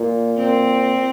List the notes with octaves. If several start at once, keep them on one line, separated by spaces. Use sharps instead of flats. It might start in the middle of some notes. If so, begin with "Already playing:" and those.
Already playing: A#2
C4